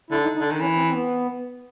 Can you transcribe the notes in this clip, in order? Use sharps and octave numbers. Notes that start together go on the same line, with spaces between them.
D3 E4
D#4
D#4
D3
D#3
E3 C#4
C4
C4
B3